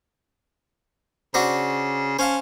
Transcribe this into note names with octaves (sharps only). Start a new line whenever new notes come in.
C#3 D4 F#4 C5
C#4 C5 F5 A5